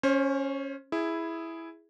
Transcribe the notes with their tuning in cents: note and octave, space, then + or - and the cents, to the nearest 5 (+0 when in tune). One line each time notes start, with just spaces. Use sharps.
C#4 +0 C5 +35
E4 +0 G#4 +0